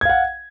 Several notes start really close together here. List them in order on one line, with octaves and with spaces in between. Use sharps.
G#6 F5 F#5